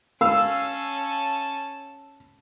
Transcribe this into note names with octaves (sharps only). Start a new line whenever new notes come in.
C#4 F5 A5 E6